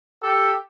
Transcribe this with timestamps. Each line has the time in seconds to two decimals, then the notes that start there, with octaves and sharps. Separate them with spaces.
0.22 G4 A4